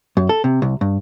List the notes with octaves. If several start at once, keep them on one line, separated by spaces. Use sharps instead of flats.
F#2
A4
C3
C2
G2